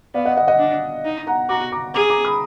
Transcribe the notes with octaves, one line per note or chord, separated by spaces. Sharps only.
B3 D5 F5
D#5 F#5
D#5 F#5
D#5 F#5
D4
D#4
F#5 A#5
F#4 A#5 D6
A#5 D6
G#4 A#5 D6
A#5 D6
B5 D#6